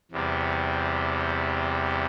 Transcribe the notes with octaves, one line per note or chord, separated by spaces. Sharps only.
E2 C3 G3